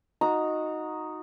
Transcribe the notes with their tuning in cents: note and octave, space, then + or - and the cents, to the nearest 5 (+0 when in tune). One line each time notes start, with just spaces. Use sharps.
D#4 +0 F#4 -20 A#5 +0